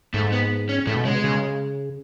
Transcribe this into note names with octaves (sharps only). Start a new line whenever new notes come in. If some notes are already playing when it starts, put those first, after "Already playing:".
G#2 A3
B3
C#4
A2 A3
B2
C#3 G#3
B2
C#3